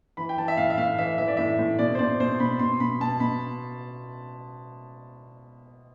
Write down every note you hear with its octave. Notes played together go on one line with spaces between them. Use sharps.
E3 B5
G5
E3 A5
E5
A2 F5
E5
A2 F5
E3 E5
E3 E5
D5
A2 E5
A2
B2 D5
C5
B2 D5
B2 C5
B2 B5
B2 C6
B2 B5
B2 A5
B2 B5